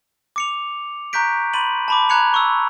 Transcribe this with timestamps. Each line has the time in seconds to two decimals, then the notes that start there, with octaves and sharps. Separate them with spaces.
0.36 D6 C#7 F7
1.13 A#5 C#6 F#6 G6 B6 D7
1.53 B5 C6 A6 D#7 F#7
1.88 A5 B5 D6
2.09 A#5 B5 F#6 G#6 C#7 F7
2.34 C#6 E6